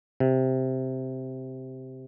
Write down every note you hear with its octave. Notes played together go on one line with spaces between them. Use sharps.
C3